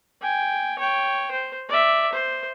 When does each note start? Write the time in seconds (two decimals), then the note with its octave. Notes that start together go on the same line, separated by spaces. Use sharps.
0.22 G5 G#5
0.79 C#5 G5
1.31 C5
1.69 D5 E5
2.12 C5